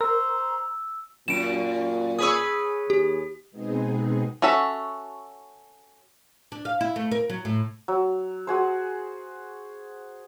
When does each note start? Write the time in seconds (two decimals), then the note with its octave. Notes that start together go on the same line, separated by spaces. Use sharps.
0.01 A#4 C5 A#5 E6
1.28 F#2 A#2 D7 E7
2.19 G#4 B4 C#5 D#6 E6
2.90 D#2 G4
3.51 B2 G#3 B3 C4 D#4 G#4
4.42 C#4 F#4 A4 E5
6.52 D4
6.65 F5
6.81 E4
6.96 A3
7.12 A#4
7.30 F#3
7.45 A2
7.88 F#3
8.47 F#4 G#4 C5